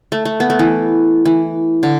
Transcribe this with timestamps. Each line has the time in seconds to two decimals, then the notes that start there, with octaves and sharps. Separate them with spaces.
0.12 A3
0.25 A3
0.40 B3
0.50 A3
0.59 E3
1.25 E3
1.83 D3